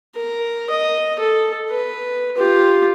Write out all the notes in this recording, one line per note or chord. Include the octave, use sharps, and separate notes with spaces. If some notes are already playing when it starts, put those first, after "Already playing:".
A#4
D#5
A4
B4
F4 G4